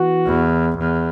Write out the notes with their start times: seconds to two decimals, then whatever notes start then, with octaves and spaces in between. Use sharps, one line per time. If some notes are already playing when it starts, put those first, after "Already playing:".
Already playing: E3 B3 F#4
0.26 E2
0.77 E2